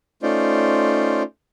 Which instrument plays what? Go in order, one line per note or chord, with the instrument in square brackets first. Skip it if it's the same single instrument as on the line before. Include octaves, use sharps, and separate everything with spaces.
[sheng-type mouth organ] A3 C#4 D#4 F4 C5 D5